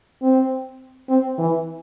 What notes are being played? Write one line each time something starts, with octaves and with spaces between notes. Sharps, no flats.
C4
C4
E3